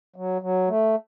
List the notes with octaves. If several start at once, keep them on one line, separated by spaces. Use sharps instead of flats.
F#3
F#3
A3